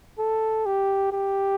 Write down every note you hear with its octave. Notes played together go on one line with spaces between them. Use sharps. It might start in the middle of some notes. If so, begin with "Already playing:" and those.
A4
G4
G4